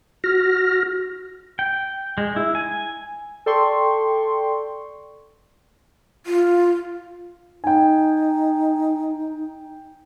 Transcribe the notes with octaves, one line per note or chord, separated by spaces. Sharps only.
F#4 F6 A#6
G5
G#3
E4
G#5
A4 D5 G5 C6 C#6
F4
D#4 G5 G#5